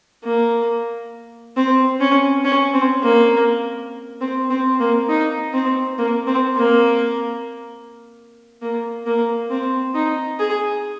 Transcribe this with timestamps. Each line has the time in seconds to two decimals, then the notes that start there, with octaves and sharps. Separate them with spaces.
0.24 A#3
1.56 C4
2.00 C#4
2.44 C#4
2.74 C4
3.03 A#3
4.21 C4
4.50 C4
4.80 A#3
5.09 D#4
5.53 C4
5.98 A#3
6.27 C4
6.56 A#3
8.62 A#3
9.06 A#3
9.50 C4
9.95 D#4
10.39 G#4